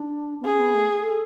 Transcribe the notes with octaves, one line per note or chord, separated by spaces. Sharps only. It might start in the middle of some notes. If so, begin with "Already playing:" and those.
Already playing: D4
B3
C#4 G#4
B3
A3
A4